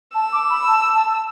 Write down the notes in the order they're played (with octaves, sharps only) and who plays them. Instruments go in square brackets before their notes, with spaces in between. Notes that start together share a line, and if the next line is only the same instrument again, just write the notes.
[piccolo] A5 [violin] E6
[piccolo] D6
B5
A5
A5